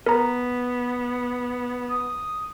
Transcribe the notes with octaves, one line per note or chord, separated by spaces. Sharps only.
B3 A#4 A#5
D#6